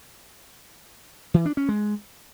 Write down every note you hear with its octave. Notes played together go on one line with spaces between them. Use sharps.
E3
D4
C#4
G#3